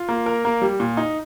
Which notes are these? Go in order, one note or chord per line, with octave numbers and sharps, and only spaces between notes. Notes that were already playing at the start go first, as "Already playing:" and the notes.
Already playing: F4
A#3
A#4
A#3
G3
A#2
D#4